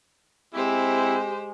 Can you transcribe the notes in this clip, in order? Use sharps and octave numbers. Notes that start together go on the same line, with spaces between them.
G#3 C4 E4 G4 C5